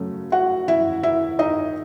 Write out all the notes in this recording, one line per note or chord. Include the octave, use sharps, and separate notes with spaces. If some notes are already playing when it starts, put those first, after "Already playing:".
Already playing: F#2 C#3 F#3 A3 C#4
F#4 F#5
E4 E5
E4 E5
D#4 D#5